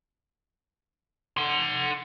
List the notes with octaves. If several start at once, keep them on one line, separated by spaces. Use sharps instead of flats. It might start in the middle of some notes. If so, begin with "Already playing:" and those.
F#5 C6